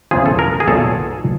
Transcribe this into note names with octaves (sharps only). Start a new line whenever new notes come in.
E2 C#3 F3 G#4
A4
A#4
G#4
B1 A#2 F#3 A4